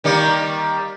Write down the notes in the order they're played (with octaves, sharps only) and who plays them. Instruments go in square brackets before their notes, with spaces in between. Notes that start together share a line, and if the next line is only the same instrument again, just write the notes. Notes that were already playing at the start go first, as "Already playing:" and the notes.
[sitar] D#3 G3 A#3